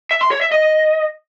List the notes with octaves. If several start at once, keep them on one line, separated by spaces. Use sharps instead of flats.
E5
C6
C#5
E5
D#5